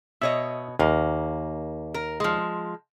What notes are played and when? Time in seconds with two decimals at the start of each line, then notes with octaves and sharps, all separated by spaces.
0.22 B2 C#5 D#5 E5
0.79 D#2 A#3
1.94 A#4
2.20 F3 G#3